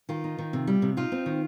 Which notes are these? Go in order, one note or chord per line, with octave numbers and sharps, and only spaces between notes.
D#3 F4
D#4
D#3
C3
G3
C3
D#4 F4
C4
D#3